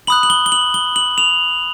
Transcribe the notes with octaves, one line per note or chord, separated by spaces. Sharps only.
B5 D#6 F#6 F#7
F#7
G7
G7
F#7
G7
F#7
F7